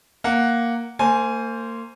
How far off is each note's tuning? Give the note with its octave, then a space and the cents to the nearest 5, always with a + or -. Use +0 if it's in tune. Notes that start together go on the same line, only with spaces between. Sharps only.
A#3 +0 F#5 +0
A#3 -35 C5 +0 G#5 +0